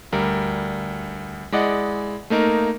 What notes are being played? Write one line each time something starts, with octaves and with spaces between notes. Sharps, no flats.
D2 G3 A#4
G#3 E4 D5 D#5 F#5
A3 A#3 D#4 A#4